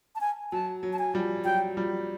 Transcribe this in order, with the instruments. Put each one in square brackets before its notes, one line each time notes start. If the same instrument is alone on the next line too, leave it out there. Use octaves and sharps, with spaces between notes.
[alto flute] A5
G#5
[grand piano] F#3 [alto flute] A5
[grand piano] F#3
[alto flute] A5
G#5
[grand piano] F3 G3
[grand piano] F#3 [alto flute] G5
[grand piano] F3 G3